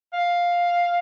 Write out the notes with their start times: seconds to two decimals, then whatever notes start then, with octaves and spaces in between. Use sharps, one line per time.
0.14 F5